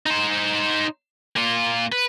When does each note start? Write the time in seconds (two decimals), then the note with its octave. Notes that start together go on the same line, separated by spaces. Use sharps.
0.06 D#4 C5
1.36 A#3 F4
1.92 B4